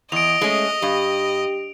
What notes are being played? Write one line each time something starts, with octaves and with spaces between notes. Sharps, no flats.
E2 D#5 D7 F7
G#3 A3 C#4
G2 G4